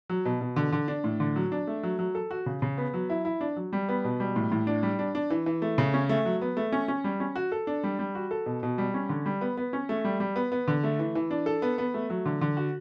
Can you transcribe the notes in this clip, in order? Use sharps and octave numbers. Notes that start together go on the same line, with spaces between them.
F#3
B2
B2
D3
D3
D4
A2
D3
F#3
D4
A3
F#3
F#3
A4
F#4
C#3
C#3
B3
F#3
E4
E4
D4
F#3
G3
B3
B2
G3
A2
A2
D4
G3
D4
D4
E3
E3
A3
C#3
C#4
A3
F#3
B3
A3
C#4
C#4
G3
C#4
F#4
A4
D4
G3
G3
F#4
A4
B2
B2
G3
C#4
D3
G3
B3
B3
C#4
A3
G3
G3
B3
B3
D3
A3
E3
E3
D4
A4
B3
B3
A3
F#3
D3
D3
F#4